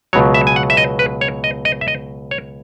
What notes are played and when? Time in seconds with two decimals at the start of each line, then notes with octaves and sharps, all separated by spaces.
0.13 C#2 B2 F#3 C#5
0.34 E5
0.47 G#5
0.56 F#5
0.70 E5
0.77 D#5
0.99 B4
1.21 C#5
1.44 D#5
1.65 D#5
1.81 E5
1.88 D#5
2.31 C#5